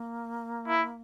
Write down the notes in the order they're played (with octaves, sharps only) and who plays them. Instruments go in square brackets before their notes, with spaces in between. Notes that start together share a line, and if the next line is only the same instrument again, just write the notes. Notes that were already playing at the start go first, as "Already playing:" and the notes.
Already playing: [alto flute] A#3
[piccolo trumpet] E4